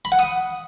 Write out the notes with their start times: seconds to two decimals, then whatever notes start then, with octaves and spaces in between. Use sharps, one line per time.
0.05 B5
0.12 F#5
0.19 D#6